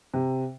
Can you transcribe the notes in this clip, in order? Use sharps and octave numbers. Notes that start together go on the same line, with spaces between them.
C3